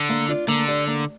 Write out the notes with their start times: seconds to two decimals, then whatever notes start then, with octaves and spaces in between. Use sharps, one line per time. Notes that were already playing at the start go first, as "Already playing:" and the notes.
Already playing: D3
0.09 A#3
0.29 D4 F4 D5
0.47 D3 A#3
0.68 G4 D5
0.87 A#3